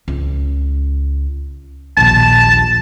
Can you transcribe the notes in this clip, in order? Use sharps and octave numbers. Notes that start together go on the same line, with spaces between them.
C#2
A#1 D#2 A5